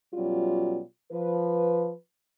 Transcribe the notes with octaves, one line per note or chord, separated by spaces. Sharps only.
B2 F#3 G3 C#4 F4
F3 B4